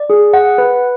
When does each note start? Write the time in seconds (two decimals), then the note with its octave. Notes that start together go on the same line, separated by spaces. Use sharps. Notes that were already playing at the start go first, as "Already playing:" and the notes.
Already playing: D5
0.10 G#4
0.33 F#5
0.58 B4